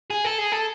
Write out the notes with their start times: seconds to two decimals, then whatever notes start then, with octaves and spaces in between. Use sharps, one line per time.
0.10 G#4
0.24 A4
0.39 G#4
0.52 A4